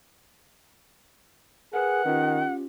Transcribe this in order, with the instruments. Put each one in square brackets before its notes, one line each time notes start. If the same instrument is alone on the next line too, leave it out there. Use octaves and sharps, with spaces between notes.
[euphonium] G#4 [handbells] A#4 B4 [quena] F#5
[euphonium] D#3 [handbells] C#4 F4 G4